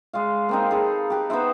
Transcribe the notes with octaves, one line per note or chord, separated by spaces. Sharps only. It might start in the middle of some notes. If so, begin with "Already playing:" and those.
G#3 D5 F5
A#3 C4 D#4
G#4 A4 B4
G4 B4
B3 D#4 C5 E5